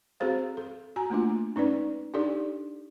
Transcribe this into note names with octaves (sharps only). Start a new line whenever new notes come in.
C4 F#4 G#4 A4 C5 F5
A4
F#4 G#5 A#5
A3 A#3 D4 F4
C#4 D#4 B4 D5
D4 D#4 G4 A4 D5